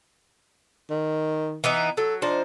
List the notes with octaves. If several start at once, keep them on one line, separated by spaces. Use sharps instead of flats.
D#3
E3 B3 D#4
F#3 A4
F3 D4 D#4 C5